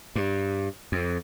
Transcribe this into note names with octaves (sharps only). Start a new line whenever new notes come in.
G2
F2